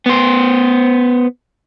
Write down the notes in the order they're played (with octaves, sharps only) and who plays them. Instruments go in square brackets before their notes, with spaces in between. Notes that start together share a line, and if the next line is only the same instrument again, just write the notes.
[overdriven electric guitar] B3 C5